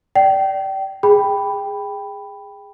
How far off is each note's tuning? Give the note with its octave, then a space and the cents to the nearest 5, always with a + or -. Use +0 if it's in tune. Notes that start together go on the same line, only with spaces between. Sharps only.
D5 +0 G5 -25
G#4 -10 G5 +10 B5 +0